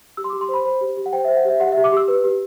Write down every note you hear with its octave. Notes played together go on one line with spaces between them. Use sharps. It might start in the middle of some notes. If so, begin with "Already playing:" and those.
G4 E6
C6
D6
G4
C6
C5 B5
C5 B5
G4
G4
F#5
C5 G5
E5
C5
F#5
G4 E5
G4 F#5
E5
G4
D6
G4 E6
B4
G4